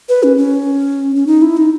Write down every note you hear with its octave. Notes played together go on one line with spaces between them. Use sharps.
B4
C#4
C#4
C#4
D#4
E4
D#4